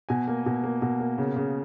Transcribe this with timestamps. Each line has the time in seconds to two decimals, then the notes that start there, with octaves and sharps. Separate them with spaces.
0.09 B2 G#5
0.28 A#3
0.46 B2
0.64 A#3
0.82 B2
1.00 A#3
1.18 C#3
1.37 C#3